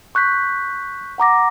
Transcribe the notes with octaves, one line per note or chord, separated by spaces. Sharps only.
C#6 F#6 G6 B6
F#5 A#5 D6 A#6